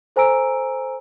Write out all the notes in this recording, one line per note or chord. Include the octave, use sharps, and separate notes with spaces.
A4 C5 G#5 A#5 E6 D7